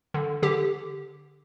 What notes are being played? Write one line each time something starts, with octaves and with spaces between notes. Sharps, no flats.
D3
D3 G4